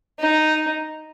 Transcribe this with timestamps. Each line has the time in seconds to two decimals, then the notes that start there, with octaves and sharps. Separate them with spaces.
0.19 D#4